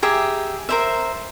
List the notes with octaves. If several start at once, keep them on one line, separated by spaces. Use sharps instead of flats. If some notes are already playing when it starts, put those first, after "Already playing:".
G4 G#4 E5 A#5
A#4 C5 E5